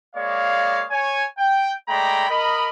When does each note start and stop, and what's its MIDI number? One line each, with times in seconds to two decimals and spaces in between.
0.15 0.85 56
0.15 0.85 58
0.15 0.85 73
0.15 0.85 74
0.15 0.85 77
0.91 1.23 73
0.91 1.23 80
1.38 1.72 79
1.88 2.29 56
1.88 2.29 57
1.88 2.29 74
1.88 2.29 79
1.88 2.29 82
1.88 2.29 83
2.29 2.69 70
2.29 2.69 75
2.29 2.69 83